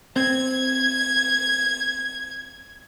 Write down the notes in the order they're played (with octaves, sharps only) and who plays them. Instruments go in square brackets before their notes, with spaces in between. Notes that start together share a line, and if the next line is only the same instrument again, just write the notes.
[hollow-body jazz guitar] C4 [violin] G#6